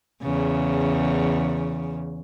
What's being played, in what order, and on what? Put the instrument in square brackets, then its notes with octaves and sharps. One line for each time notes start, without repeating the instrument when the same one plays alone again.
[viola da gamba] E2 C#3